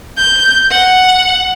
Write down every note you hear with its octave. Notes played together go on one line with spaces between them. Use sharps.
G6
F#5